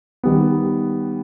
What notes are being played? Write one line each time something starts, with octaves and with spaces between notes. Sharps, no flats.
D#3 G3 B3